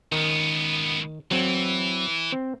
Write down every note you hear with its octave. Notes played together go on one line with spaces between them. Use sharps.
C#2 D#3 B3
E3 F#3 C4
C4